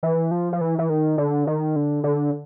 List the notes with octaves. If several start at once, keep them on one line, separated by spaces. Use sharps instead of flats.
E3
F3
F3
E3
E3
D#3
D3
D#3
D3
D3